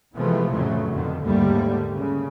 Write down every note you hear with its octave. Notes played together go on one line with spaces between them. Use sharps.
C3 E3 F3 G#3 A3 B3
F2 A2 C#3 F#3 A3
F2 B2 D3 D#3
D#2 G#2 D3 G3 A3 A#3
C#3